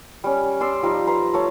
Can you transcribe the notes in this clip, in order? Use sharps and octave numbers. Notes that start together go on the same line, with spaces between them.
G3 C#4
D5 C6 E6
F3 G3 D#4
B4 A#5 C6
A3 C#5 A5